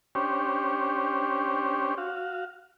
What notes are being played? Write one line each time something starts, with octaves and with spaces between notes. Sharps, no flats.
C#4 D4 G4 C5 C#5
F#4 F5